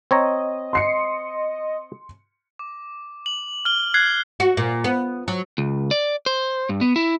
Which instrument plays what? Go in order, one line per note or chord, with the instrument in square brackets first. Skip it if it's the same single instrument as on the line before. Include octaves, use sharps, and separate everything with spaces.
[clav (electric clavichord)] C4 C#5 A#5 [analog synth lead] D#5
[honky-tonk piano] C6 C7 C#7
[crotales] D6
F#7
F6 G7
F#6 G#6 C7
[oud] F#4
A#2
B3
F#3
[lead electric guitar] C#2
D5
C5
G2
B3
E4